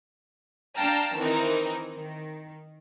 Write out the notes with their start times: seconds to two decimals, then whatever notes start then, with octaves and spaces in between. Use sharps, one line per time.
0.75 D4 F5 G5 A5 A#5
1.17 D#3 E3 C4 D#4 A#4
1.95 D#3